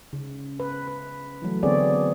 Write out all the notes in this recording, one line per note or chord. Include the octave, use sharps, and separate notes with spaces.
C#3
B4
B4
E3 F#3 A3
D3 B3 C4 G#4 C#5 D5